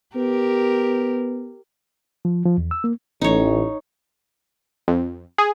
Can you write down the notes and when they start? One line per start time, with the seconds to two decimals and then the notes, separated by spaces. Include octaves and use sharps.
0.16 B3 G4 A#4
2.25 F3
2.46 F3
2.58 E2
2.71 E6
2.84 A#3
3.21 A1 D#4 C#5
4.88 F2
5.38 G#4